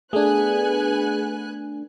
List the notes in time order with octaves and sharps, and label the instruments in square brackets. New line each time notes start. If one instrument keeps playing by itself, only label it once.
[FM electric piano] A3 D4 [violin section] B3 G#5 F#6 [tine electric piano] G#4